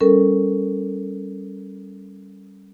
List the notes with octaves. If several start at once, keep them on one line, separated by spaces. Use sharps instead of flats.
G3 C#4 A4 A#4